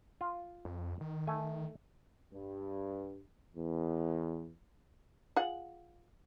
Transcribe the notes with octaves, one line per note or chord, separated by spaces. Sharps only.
F4
F2
D#3
A3 G#5
G2
E2
F4 G#4 F#5